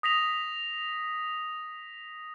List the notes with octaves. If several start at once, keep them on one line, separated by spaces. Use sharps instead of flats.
D#6 A#6 B6 F7